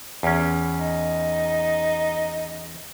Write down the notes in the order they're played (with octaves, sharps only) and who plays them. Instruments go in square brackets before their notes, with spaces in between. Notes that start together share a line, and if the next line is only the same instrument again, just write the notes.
[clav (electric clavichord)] E2 C#4
[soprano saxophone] D#4